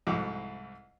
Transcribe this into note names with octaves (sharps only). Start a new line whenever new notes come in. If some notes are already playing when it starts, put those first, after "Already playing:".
C2 F2 G#2 E4 F#4 D6